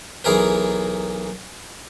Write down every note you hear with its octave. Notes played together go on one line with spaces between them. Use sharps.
B1 E3 G#4 A#4 B4